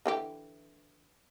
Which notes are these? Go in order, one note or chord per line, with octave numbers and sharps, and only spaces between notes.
D3 E3 G4